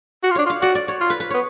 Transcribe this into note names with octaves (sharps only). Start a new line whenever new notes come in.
F#4
F4
D4 C#5
F4
F5
F#4 D5
D5
C#5
F4
B4
B4
B3 C#5